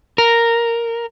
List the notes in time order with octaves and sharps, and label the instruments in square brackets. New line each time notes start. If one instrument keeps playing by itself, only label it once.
[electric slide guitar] A#4